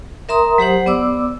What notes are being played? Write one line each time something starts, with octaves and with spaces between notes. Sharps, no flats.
A#4 E5 A#5 C6 D#6
F#3 G4 C5 F#5
B3 D5 D6 E6